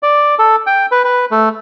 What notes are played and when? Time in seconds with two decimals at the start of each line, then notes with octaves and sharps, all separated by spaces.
0.03 D5
0.39 A4
0.67 G5
0.92 B4
1.04 B4
1.31 A3